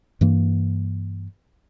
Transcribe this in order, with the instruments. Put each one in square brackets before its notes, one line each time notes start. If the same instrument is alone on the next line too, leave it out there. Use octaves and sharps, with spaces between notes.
[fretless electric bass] G2 E3 A#3